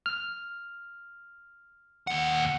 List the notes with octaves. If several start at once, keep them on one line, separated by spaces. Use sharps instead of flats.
F6
D#2 F#5